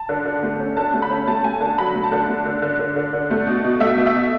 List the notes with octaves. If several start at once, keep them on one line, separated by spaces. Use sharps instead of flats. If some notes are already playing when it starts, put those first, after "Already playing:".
Already playing: A5
D3
D3
A3
C#4
D3 A5
A3
B5
C#4
A3 A5
A3 G#5
D3 A5
F#3 B5
A3
A5
D3
A3
D3
D3
D3
D3
D3
A3
B2
B2
A3 E5
B2
E5
B2